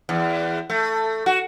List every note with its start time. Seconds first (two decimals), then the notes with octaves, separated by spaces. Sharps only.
0.09 E2
0.70 A3
1.26 F#4